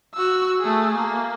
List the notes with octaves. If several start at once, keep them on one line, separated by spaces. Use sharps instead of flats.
F#4 E6
A3 G#4
A#3